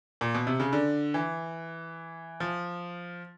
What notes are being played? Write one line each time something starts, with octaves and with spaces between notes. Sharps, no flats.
A#2
B2
C3
C#3
D3
E3
F3